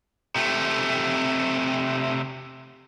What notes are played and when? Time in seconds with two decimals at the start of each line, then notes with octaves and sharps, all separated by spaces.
0.36 C3 A3